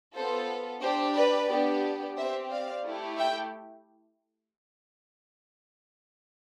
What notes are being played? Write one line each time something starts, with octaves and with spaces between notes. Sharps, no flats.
B3 F4 A4 C5
D4 G4 C5
B4 D5
B3 D4 G4
C4 G4 C5 E5
D5 F5
A3 E4 G4
E5 G5